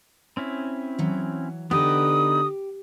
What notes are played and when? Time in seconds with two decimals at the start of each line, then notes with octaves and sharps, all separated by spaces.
0.37 C4 C#4 E4
0.99 E3 F#3
1.71 D3 B3 D#4 G4 B4 D#6